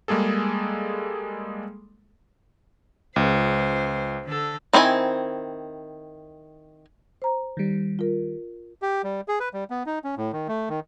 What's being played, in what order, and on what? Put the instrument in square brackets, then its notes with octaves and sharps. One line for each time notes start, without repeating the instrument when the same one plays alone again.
[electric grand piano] G3 G#3 A#3 G#4 A4
[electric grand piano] C#2 [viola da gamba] C5
[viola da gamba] D3 A4
[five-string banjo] D#3 C4 E4 F#4 G#5
[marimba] C5 A#5
[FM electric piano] D#3 G3
[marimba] F4 A#4
[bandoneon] G4
G3
G#4
B4
G3
B3
D#4
C#4
A2
D#3
A3
D#3